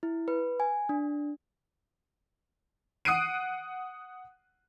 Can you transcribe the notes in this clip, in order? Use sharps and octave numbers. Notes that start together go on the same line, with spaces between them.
E4
B4
G#5
D4
F#5 D#6 F#6 C7 D7 D#7